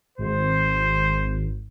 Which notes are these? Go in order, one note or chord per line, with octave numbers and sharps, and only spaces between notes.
G#1 C5